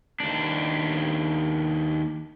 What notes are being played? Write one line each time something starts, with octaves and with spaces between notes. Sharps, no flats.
D#2 D4